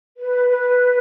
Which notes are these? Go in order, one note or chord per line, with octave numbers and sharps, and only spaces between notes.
B4
B4